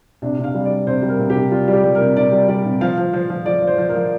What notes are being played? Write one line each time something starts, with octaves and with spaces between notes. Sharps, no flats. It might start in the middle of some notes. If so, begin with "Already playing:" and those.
C3 D4
C3
F5
G3
G3 D5
C3 C5
G3
A#4
C3
G4
C3
G3 F4
G3
G4
G3
A#4
C3
C3 D5
G3
G3 D5
C3
F3 F5
F3
F3
F3
F3 D5
F3
C5
F3
A#4
F3